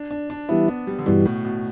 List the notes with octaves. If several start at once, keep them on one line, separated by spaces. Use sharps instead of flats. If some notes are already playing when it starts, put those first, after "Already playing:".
Already playing: D4
D4
D4
E3 G3 B3 E4
B3
G3
D3
G2 B2 E3 G3
A2
B2